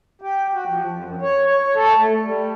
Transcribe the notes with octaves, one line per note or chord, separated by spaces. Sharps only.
G4
F#4
F3
F2
F#2
C#5
C#5
A4
A3
G3